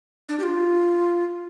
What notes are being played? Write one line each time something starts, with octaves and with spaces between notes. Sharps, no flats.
D4
G4
F4